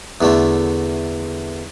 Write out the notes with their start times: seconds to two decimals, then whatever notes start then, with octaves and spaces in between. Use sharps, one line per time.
0.21 E2 D3 A3